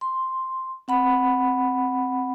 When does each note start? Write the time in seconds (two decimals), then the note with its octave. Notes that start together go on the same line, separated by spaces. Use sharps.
0.01 C6
0.88 C4 F#5 B5